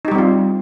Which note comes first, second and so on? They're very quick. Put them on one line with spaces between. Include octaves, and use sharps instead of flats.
D#4 G4 G3 C4 F4